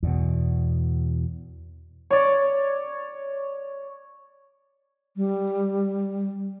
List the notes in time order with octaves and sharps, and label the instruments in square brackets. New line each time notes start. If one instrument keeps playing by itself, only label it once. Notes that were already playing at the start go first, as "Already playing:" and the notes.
[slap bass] E2 B2
[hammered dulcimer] C#5 D5
[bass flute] G3